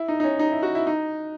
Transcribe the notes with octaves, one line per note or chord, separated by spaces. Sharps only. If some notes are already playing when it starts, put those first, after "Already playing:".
Already playing: E4
D#4
D#4
C#4
D#4
E4
F#4
E4
D#4